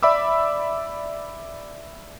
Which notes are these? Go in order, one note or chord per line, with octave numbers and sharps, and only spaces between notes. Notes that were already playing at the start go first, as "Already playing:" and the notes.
D5 E5 B5 D6 E6